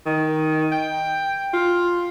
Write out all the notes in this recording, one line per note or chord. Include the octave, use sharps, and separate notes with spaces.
D#3
G5
F4